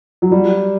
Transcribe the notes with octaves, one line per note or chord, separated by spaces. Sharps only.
F#3
G3